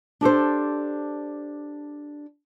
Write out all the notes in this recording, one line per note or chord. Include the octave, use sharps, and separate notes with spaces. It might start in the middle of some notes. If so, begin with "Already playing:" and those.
D4 G4 A4 C5